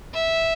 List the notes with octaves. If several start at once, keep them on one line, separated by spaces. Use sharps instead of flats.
E5